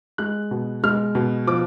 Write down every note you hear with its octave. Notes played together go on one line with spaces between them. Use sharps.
G#3 F#6
B2
G#3 F6
B2
F3 D6